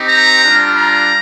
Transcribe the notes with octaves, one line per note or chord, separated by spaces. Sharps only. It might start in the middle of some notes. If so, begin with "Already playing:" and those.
Already playing: C4 D#4 G4
A#5
G3 D4 F4
A#5